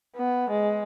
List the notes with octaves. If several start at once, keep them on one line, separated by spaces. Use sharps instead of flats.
B3
G#3